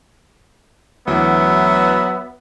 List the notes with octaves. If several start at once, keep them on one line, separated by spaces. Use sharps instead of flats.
D2 E3 F#3 B3 E5